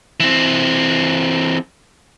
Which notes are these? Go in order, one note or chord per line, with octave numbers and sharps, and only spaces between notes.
E3 C4